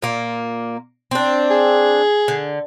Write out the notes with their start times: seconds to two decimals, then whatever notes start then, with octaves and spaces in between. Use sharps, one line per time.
0.02 A#2 A#3
1.11 C4 D4
1.50 G#4
2.28 D3